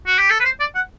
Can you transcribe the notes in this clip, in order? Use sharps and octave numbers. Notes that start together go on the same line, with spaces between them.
F#4
G4
A4
B4
C5
D5
F#5